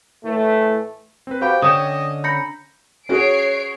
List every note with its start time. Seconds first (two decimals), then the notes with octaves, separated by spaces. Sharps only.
0.24 A2 E3 A3
1.27 C4 B4
1.41 F#4 G4 C5 F5 G5 B5
1.62 D3 C#4 C#5 D#5 G5 D#6 G6 E7
2.24 A#5 B5 G6 A#6 C#7
3.09 C#4 F#4 G#4 C#5 C7 D7